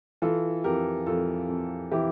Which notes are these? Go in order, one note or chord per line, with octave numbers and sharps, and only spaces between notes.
E3 F4 A4
F2 G4 A#4
F2 F4 A4
F2
E3 E4 G4